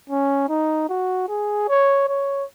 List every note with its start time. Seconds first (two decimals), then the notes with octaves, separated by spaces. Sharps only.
0.10 C#4
0.49 D#4
0.89 F#4
1.28 G#4
1.68 C#5
2.08 C#5